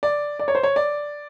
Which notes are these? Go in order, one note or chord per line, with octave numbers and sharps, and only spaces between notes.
D5
D5
C#5
C5
C#5
D5